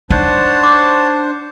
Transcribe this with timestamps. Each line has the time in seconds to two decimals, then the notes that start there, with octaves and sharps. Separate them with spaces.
0.10 D4 D#4 C5 C#5 F#5 A5
0.63 D6